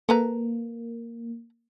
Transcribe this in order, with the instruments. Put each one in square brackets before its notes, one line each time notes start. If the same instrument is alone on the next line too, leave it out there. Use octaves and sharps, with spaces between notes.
[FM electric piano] A#3 [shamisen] A4 B4 A#5